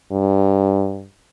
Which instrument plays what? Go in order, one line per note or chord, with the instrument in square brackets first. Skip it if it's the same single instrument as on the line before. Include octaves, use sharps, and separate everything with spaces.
[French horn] G2